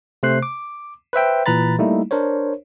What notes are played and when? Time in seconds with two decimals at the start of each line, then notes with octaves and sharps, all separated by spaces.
0.23 C3 A3 C5 F#6 C7
0.43 D6
1.13 B4 C5 E5 G5
1.46 A#2 E3 B4 A#5 B5 A6
1.79 G3 A3 A#3 D#4 E4
2.11 D4 A#4 C5 C#5